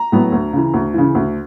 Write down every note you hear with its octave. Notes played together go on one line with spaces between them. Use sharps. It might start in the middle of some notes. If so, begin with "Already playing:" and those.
Already playing: A#5
A2 F#3 B3
D2
C#3 E3
D2
C#3 E3
D2